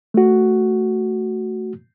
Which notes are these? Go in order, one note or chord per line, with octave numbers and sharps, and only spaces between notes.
A3 F#4